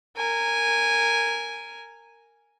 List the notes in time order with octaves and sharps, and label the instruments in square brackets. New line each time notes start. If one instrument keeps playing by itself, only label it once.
[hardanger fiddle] A#4 G#5